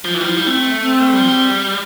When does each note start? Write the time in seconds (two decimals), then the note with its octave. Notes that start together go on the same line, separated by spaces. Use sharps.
0.05 F3
0.14 E3 F4
0.21 G3
0.25 F3 E4
0.37 G3 E4
0.47 A3 C4
0.80 C4
1.13 G3
1.21 F3
1.28 G3